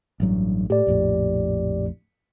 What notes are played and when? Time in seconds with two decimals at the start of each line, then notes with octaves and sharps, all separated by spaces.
0.20 A1 G2 F#3
0.70 A2 G4 D5
0.87 A#1 F2 A2